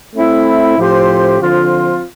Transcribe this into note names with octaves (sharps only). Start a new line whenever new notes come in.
A3 C4 E4
A2 F3 C4 G4 C5
D3 F3 C4 F4